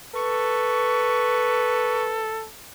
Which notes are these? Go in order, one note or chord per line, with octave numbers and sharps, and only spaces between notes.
A4 B4 C#6